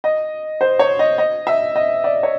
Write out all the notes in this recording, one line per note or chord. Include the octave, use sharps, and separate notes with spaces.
D#5
C5
C#5
D#5
D#5
E5
D#5
D5
C#5